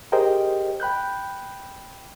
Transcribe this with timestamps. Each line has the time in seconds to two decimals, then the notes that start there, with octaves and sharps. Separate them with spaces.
0.12 G4 G#4 A#4 C5 D#5 G5
0.80 G5 B5 F#6 G6